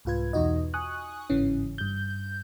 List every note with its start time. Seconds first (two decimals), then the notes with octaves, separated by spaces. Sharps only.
0.05 C2 G#2 F4 B4 G#6
0.33 E2 B2 D#4 F#4 D#5
0.74 G#5 C#6 D#6 F#6
1.30 G1 G#2 C#3 E3 C#4
1.78 G2 G6